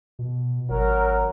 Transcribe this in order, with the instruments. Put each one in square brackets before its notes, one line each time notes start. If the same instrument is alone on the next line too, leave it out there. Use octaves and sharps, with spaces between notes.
[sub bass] B2
[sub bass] G#1 [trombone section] F#3 A#4